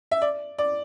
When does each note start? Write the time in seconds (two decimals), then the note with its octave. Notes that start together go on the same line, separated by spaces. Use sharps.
0.11 E5
0.22 D5
0.59 D5